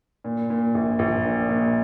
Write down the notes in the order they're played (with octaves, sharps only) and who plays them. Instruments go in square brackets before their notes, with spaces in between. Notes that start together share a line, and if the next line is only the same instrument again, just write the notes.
[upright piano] A#2
A#2
A#1
A#1
A#2
A#2